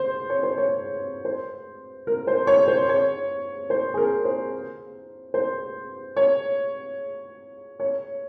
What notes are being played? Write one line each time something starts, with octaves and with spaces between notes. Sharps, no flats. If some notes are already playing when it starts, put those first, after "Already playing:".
Already playing: C5
C#5
C5
C#5
C5
A#4
C5
C#5
C5
C#5
C5
G#4
A#4
C5
C5
C#5
C#5